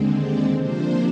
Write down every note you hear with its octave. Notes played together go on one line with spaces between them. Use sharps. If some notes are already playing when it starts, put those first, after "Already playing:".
Already playing: D#2 D3 G#3 C4
D5
C3 F3 A#3 D4 C5